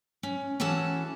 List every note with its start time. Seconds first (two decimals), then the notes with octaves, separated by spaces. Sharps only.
0.23 C#4
0.60 E3 C#4 F#4 A4 A5